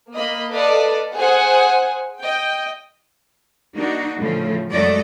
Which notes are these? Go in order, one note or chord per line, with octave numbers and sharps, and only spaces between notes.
A#3 D#5 B5
A4 B4 D5 D#5 F5
G#4 C5 F#5 G#5
D#5 G5
A#3 D4 D#4 F#4
A2 C#3 F3 A3
F#2 G#3 A3 F#4 D5 D#5